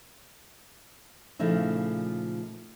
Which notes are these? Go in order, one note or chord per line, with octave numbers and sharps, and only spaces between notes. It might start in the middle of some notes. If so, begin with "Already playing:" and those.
A#2 C#3 F3 A3 D#4 E4